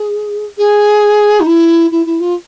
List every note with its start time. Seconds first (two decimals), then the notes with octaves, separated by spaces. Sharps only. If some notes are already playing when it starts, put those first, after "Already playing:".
Already playing: G#4
0.58 G#4
1.40 D#4
1.46 E4
1.91 E4
2.06 E4
2.20 F4